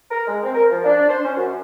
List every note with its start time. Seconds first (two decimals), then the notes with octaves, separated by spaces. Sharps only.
0.11 A#4
0.26 G#3
0.43 C4
0.55 A#4
0.71 F3
0.84 D4
1.09 C5
1.24 C#4
1.37 F#2